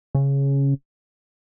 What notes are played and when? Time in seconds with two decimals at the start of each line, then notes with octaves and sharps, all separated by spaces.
0.15 C#3